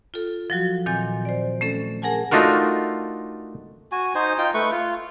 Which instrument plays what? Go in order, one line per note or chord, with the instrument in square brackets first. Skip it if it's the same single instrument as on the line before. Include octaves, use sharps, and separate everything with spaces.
[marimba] F4 A4
F3 F#3 F#4
A#2 D#3 C4 G#5 G6 A6
C5 D5
A3 C#4 A4
G#4 A#4 F#5 G#5 A5
[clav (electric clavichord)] A3 D4 D#4 F4 F#4 A#4
[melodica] F#4 G#5
D#4 C5 G#5
D#4 F4 G5
A3 B4 C#6
F4